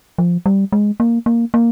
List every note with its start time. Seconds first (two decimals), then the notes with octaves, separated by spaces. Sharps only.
0.18 F3
0.46 G3
0.72 G#3
1.00 A#3
1.26 A#3
1.54 A#3